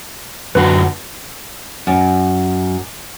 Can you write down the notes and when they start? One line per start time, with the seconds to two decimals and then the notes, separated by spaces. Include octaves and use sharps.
0.55 F#2 D3 F#4 B4
1.87 F#2